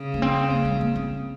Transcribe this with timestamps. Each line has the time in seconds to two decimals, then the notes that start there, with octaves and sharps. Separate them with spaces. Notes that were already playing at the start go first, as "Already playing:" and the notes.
Already playing: C#3
0.14 A#3
0.22 C4
0.51 A#3
0.65 G#3
0.81 A#3
0.96 C4